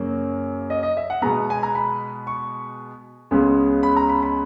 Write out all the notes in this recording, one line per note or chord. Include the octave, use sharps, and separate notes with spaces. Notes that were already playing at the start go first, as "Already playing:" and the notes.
Already playing: F#2 C#3 F#3 A#3
D#5
D#5
E5
F#5
B2 G#3 B3 A#5
G#5
A#5
B5
C#6
C#2 C#3 G#3 B3
B5
A#5
B5
B5